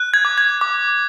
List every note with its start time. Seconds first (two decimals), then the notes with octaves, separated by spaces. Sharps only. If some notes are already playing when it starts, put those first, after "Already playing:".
Already playing: F#6
0.14 G#6
0.25 D6
0.38 G#6
0.61 D6